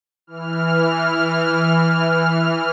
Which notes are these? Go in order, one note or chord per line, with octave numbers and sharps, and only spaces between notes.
E3 F6